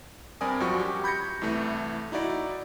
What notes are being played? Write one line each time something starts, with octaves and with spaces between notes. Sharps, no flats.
G2 C4 A#4 D5 G#5 D#6
F#2 F3 G3 F#4 C#6
G4
B5 G6 G#6 A#6 C#7
C2 E3 A3
D#4 E4 F#4 D5